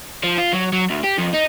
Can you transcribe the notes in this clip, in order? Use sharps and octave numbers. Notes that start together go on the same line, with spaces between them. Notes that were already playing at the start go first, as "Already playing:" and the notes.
F3
F4
F#3
F#3
D2
G4
F2
D#4